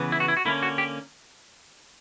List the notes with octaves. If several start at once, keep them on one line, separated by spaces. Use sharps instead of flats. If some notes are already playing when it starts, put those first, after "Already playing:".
Already playing: C#3 E3 B3
E4
F#4
E4
F#4
D3 A#3 C#4 E4
F#4
G4